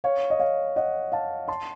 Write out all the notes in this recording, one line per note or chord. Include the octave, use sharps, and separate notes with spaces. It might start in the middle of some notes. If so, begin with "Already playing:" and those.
C#5 F5
D#5
C#5 F5
D#5 F#5
F5 A5
A5 C6